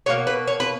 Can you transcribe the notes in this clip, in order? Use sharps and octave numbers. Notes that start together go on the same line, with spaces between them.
B2 A#3 C#5
B4
C#5
B4